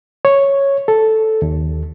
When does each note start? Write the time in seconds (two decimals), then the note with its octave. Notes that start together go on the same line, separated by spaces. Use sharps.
0.25 C#5
0.88 A4
1.42 D#2